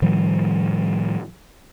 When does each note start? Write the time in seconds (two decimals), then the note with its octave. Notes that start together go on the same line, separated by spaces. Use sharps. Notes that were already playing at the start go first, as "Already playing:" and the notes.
0.02 A2 D#3 F3 G3